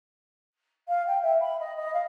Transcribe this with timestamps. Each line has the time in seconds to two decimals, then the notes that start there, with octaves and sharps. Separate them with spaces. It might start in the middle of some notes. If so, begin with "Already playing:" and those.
0.88 F5
1.07 G5
1.22 E5
1.41 B5
1.60 D#5
1.76 D#5
1.94 F5